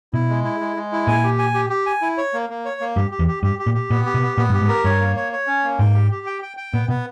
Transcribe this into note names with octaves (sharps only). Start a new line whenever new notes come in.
B2 E4
G#3
E4
G#3
G#3
E4
A#2 G#5
G4
G#5
G4
G4
G#5
E4
C#5
A#3
A#3
C#5
A#3
G2 G4
G4
E2
G4
G2 G4
G4
A#2
G4
A#2 B3
G4
B2
B3
A#2 B3
G2 G4
G#2
A#4
G2 C#5
A#3
C#5
C#5
C#4
A#3
G#2 G5
G4
G4
G5
G5
G5
A#2 B3
B2 B3